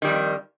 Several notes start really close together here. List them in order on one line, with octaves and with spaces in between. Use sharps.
D#3 G3 F2